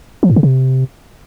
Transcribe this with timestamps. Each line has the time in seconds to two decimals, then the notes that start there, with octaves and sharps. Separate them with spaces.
0.23 F3
0.30 G#2
0.36 C#3
0.43 C3